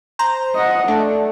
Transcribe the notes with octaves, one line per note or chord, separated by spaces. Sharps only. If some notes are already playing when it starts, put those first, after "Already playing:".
C5 A#5
D#5 F#5
A3 D4